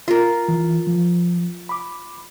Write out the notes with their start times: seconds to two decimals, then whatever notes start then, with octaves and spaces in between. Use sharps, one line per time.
0.08 F4 A#4
0.48 E3
0.87 F3
1.69 B5 D6